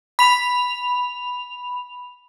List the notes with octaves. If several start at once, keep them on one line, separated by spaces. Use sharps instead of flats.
B5 F7